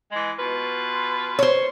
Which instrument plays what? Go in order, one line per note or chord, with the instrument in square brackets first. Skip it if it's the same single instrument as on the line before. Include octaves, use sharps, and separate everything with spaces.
[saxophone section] E3 G#3
B2 F4 B4
[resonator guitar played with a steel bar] C5 C#5